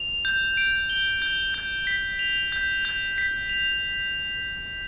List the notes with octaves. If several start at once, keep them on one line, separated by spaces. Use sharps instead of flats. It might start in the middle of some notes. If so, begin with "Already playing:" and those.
Already playing: F7
G6
D7
G7
G6
G6
B6
F7
G6
G6
B6
F7